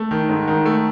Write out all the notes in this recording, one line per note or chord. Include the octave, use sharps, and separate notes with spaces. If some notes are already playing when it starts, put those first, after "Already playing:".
Already playing: A3
D#3
G#2
D#3
A3